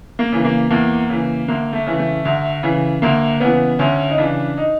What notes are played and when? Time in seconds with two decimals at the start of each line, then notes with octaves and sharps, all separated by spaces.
0.19 A#3
0.32 C#3 E3
0.45 A#3
0.70 E2 A#3
1.10 C#3 E3
1.48 D2 A#3
1.73 A3
1.86 C#3 E3
1.99 A3
2.25 D2
2.63 C#3 E3
3.02 D2 A#3
3.40 C#3 E3 B3
3.79 D2 C#4
4.10 D#4
4.18 C#3 E3 D4
4.57 D#4